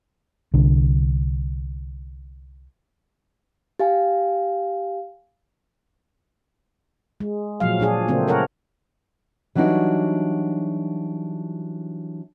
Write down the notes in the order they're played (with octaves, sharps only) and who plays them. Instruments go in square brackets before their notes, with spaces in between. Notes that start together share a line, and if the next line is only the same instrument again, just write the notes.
[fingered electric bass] C2 D3
[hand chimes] G4 F5 G#5
[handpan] G#3
A#2 F3 F#3 F5
A#2 D4 G#4 F5
C#3 A3 A#3 C4 D4
A4 A#4 C#5 F#5
[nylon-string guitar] E3 F#3 G3 D4 D#4 F#4